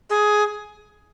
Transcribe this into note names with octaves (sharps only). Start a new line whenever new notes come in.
G#4